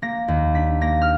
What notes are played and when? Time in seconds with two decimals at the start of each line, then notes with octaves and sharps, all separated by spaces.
0.02 A#3 A#6
0.28 D#2
0.55 D4 B6
0.81 A#3 A#6
1.02 F6